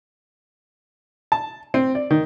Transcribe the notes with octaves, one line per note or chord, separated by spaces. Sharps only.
A5
C4
D5
D#3